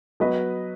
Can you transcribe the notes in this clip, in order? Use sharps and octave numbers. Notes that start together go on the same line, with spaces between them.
F#3 B3 F#4 B4 D#5